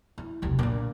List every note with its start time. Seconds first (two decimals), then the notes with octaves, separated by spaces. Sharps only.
0.18 E4
0.42 E1 C2
0.59 A#2 D3